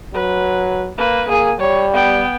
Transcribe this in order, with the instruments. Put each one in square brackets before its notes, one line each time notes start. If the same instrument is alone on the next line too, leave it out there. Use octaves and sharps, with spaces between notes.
[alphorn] F#3 [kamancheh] B4
[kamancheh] A#3 B4
[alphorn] A#3 [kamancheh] G#4 G#5
[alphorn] G3 [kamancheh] C#5
[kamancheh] B3 G5